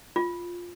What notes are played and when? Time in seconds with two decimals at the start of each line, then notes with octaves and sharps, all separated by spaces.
0.16 F4